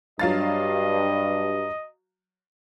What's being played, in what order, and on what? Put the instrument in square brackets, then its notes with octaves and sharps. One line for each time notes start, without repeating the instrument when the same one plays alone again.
[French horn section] G2 [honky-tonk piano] F#3 F5 A6 [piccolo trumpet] D#5